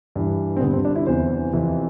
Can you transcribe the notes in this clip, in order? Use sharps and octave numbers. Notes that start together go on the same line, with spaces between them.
G2 E3
C4
G2 D3 B3
C4
D4
E4
E2 C3 E3 C5
F2 C3 E3